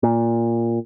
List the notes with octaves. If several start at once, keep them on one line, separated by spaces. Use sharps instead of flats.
A#2